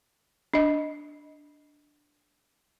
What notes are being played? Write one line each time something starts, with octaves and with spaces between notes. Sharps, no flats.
D4 D#5